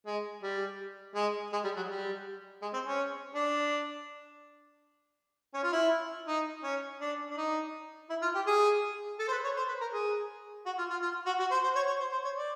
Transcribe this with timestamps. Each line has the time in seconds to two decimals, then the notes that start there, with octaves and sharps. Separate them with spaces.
0.06 G#3
0.42 G3
1.15 G#3
1.53 G#3
1.64 G3
1.76 F#3
1.89 G3
2.62 G#3
2.73 C4
2.86 C#4
3.35 D4
5.54 C#4
5.63 F4
5.72 E4
6.27 D#4
6.63 C#4
7.01 D4
7.30 D4
7.37 D#4
8.10 E4
8.22 F4
8.35 G4
8.47 G#4
9.19 A4
9.28 C5
9.32 B4
9.44 C#5
9.56 C5
9.68 B4
9.80 A#4
9.93 G#4
10.66 F#4
10.78 F4
10.90 F4
11.02 F4
11.26 F#4
11.39 F#4
11.51 C5
11.63 C5
11.75 C#5
11.87 C#5
12.00 C5
12.12 C5
12.24 C#5
12.36 D5